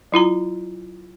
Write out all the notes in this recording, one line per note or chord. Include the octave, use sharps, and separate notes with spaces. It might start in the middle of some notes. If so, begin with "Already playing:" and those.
F#3 E4 F4 A#5